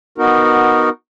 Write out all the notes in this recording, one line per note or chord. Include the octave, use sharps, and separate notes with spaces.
B3 D#4 F#4 A#4